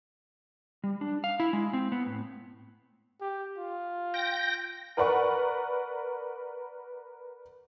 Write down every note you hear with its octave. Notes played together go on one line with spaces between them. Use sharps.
G3
D4
F5
E4
G#3
C4
B3
A2
G4
F4
G5 A#6
A#4 B4 D5 F#5 B5 C#6